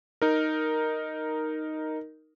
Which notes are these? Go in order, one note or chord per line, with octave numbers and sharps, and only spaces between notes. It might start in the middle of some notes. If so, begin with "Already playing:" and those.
D#4 A#4